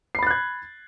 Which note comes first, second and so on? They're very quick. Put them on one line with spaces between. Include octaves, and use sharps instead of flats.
C7 B5 A6 F#6 G#6